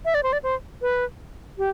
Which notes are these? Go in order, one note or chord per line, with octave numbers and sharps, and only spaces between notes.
E5
D5
C5
D5
C5
B4
G4